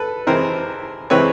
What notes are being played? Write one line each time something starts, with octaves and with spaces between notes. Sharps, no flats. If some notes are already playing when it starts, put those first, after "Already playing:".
Already playing: A4 B4
C3 E3 G#3 C4 A#4 C5
C3 E3 G#3 C4 B4 C#5